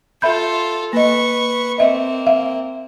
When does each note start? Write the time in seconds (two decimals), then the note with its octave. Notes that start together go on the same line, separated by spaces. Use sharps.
0.22 F4 A4 E5 B5 G6
0.93 A#3 B4 D#5 C#6
1.78 A#3 C4 D#5 E5
2.27 E5 F5